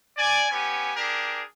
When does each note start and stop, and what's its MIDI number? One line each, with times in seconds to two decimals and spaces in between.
0.17 0.50 74
0.17 0.50 80
0.51 0.91 59
0.51 0.91 61
0.51 0.91 67
0.51 0.91 80
0.96 1.41 62
0.96 1.41 67
0.96 1.41 68
0.96 1.41 70